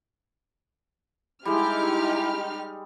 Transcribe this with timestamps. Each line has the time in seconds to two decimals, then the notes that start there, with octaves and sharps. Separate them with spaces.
1.45 G3 G#3 D#4 E4 G4 F6